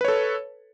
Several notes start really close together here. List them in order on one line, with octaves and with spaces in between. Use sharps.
B4 C#5 A4